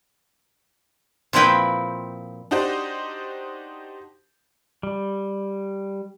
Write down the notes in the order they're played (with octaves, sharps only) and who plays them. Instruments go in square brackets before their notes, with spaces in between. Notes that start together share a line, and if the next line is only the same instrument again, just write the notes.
[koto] A#2 F3 C4 E4 B4 G5
[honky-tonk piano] D4 D#4 F#4 G4 C5
[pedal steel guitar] G3